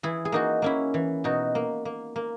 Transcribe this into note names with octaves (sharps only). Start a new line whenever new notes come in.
E3 E4 G#4
G#4
A#3 D#4 F#4
A#3 C#4 E4
E3
B2 D#4 F#4
A#3
A#3
A#3